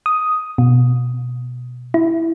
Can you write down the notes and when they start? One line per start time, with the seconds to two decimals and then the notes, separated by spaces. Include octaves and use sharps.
0.06 D#6
0.58 B2
1.94 E4